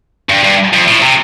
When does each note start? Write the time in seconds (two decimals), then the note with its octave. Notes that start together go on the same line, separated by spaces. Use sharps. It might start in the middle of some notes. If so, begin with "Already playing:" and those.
0.29 G2
0.43 G2
0.73 F2
0.87 A2
1.02 C3